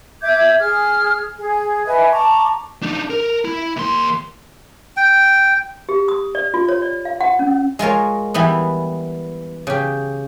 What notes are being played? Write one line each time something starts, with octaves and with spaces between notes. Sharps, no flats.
E5 D6 G6 G#6
G#4 F6
G#4
B4 D#5 E5 G#5
A5 A#5 C#6 D6
D4 D#4
A#4
E4
D#2 C6
G5
G4
D#6
D5
F4
C#5
D5
F5
F#5
C#4
G#3 F4 A#4 C#5
E3 G3 B3
C#3 G4